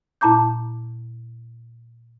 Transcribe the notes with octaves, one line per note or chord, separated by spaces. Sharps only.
A#2 E4 A5 A#5 D6 G6